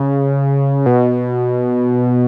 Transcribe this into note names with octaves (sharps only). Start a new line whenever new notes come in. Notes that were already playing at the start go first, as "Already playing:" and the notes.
Already playing: C#3
B2